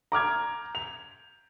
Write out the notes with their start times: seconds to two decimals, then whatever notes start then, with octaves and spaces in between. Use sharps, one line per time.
0.12 A#5 D6 F6 G#6
0.75 F7